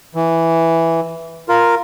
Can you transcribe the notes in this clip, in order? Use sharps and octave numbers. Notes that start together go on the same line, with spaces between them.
E3
F4 A#4